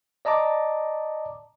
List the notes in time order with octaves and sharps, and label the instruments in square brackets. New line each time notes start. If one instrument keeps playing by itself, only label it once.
[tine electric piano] D5 D#5 A5 A#5 D6